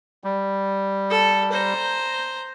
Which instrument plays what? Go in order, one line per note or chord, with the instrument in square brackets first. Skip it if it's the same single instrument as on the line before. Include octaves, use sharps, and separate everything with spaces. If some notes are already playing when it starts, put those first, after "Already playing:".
[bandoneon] G3
[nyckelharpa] A4
C5 A#5